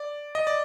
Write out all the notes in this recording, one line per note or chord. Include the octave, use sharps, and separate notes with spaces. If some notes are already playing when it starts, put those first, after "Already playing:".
Already playing: D5
D#5
D5